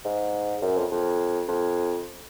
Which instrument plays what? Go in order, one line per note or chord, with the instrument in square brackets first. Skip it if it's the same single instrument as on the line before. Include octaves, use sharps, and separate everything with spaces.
[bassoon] G#2
F#2
F2
F2
F2